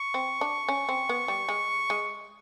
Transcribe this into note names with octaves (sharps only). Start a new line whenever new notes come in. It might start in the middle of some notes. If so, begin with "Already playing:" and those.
Already playing: C#6
C4
D4
C#4
C4
B3
G3
G#3
G#3